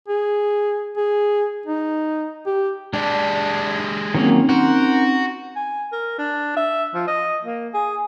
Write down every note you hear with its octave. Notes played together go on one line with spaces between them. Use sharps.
G#4
G#4
D#4
G4
G#3 D4 G4
D#3 F#3 A#3 C4 C#4 D#4
F#4 A#4 C5 F#5
G#5
A#4
D4
E5
F3
D#5
A#3
G#4